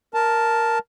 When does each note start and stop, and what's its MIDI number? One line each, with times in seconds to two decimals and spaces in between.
0.14 0.79 70
0.14 0.79 81